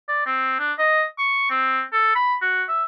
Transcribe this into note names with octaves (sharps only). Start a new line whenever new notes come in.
D5
C4
D4
D#5
C#6
C4
A4
B5
F#4
E5